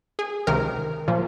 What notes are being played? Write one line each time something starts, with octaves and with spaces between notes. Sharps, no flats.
G#4
C#2 C3 D#3 A#4
A#2 F3